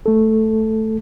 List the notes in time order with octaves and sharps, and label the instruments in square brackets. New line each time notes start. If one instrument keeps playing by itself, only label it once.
[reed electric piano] A3 A4